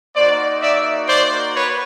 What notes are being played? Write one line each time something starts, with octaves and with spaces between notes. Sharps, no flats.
A#3 D#4 F#4 C5 D5
D5 E5
C5 D5
B4 C#5